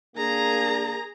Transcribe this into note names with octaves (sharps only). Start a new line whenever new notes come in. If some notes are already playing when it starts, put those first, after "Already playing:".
A#3 D4 G#4 A#5